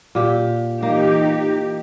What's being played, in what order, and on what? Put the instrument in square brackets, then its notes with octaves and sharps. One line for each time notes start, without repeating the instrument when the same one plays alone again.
[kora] A#2 G4
[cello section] E3 D#4 G4 [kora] A#3